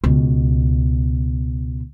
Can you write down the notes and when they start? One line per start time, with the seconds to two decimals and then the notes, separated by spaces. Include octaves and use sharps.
0.04 C#2 B2